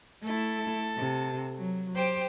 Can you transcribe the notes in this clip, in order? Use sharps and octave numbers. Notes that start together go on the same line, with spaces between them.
A3 E4 A4 A5
C3
F#3
G4 C5 G5